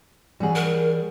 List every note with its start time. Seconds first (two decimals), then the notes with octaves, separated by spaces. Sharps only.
0.40 E3 G3 G#4 C#5 F#5
0.56 A#4